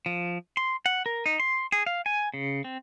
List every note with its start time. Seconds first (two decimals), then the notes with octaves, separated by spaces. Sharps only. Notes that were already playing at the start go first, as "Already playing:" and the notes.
0.06 F3
0.57 C6
0.86 F#5
1.06 A#4
1.26 D#4
1.40 C6
1.72 G#4
1.87 F5
2.06 G#5
2.34 C#3
2.64 C4